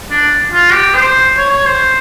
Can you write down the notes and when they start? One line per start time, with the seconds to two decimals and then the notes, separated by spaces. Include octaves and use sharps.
0.10 D4
0.53 F4
0.73 G4
0.94 C5
1.38 C#5
1.51 C#5
1.65 C5